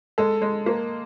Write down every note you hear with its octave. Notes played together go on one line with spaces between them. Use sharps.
G#3 A4
G#3
A#3